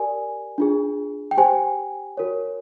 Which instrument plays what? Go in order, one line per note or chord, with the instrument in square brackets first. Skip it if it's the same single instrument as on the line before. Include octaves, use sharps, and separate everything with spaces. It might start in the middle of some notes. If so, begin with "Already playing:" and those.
Already playing: [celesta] G4 A#4 D5 G#5
D4 F4 G#4
G5
G4 C5 G#5
F#4 A#4 C#5